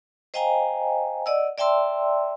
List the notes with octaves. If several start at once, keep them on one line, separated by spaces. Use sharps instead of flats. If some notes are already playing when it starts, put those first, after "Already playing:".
C5 D#5 F5 G5 G#5 A#5
D5 D#5 F#5 E6
D5 E5 G5 A5 C6 E6